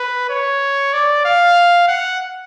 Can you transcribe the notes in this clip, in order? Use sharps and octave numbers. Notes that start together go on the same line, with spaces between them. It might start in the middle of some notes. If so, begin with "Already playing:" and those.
Already playing: B4
C#5
D5
F5
F#5